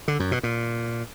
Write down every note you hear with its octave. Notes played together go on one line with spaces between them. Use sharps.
D3
F#2
B2
A#2